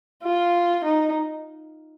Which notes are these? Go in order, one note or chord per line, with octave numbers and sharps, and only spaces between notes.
F4
D#4